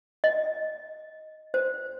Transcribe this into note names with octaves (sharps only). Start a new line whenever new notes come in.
D#5
C5